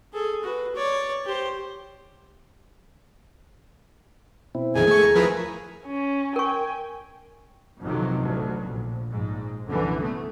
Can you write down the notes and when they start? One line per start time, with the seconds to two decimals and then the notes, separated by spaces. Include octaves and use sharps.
0.13 G#4 A4
0.43 F#4 B4
0.75 C#5 D5
1.26 G4 C5
4.55 B2 C4 E4
4.75 A#1 F2 D#3 G#4 G#5
4.87 A3 C#6
5.03 D#2 A#5
5.15 F3 E4 G#4 A#4 B4 B5
5.86 C#4
6.36 A#4 G5 G#5 C#6
7.82 A1 F2 C3 D#3 F#3
8.19 A1 D2 F#3
8.64 A#1
9.11 A#1 G#2
9.66 C2 F#2 D3 E3
10.00 A3 B3